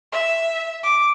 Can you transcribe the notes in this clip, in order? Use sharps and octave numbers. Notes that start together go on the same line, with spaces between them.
E5
D6